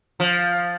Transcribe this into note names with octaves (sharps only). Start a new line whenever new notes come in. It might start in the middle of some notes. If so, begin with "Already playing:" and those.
F3